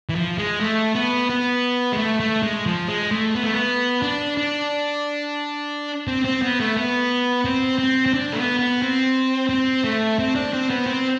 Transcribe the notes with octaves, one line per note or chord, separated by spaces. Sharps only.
E3
F3
G#3
A3
B3
B3
G#3
A3
A3
G#3
F3
G#3
A3
B3
A3
B3
D4
D4
C4
C4
B3
A3
B3
C4
C4
C4
D4
A3
B3
B3
C4
C4
A3
C4
D4
C4
B3
C4